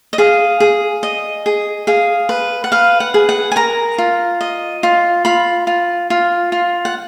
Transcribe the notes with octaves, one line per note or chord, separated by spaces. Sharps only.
D#5
G#4 F5
G#4
D#5
G#4
G#4 F5
B4
F#5
B4 F5
F#5
G#4
F#5
G#5
A#4 A#5
F4
D#5
F4
F4 B5
F4
F4
F4
F#5